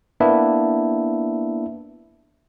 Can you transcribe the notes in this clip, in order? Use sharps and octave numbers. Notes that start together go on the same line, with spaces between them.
A#3 B3 D4 E4 E5